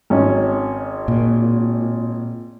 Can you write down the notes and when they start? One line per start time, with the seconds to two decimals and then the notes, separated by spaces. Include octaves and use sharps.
0.10 G#1 C#4
1.08 A#2